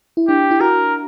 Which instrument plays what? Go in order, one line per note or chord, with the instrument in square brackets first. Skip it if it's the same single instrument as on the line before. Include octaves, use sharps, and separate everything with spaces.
[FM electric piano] E4
[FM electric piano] D4 [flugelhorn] G4
[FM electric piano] E4
[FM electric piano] F#4 [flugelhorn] A#4